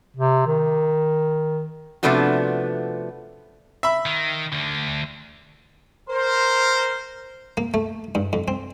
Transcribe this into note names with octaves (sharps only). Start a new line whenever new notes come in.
C3
D#3
C3 F3 A3 B3 D4 F#4
E5 B5
D#3
D2 D3
A#4 C5
A#3
A3
G2
F2
C4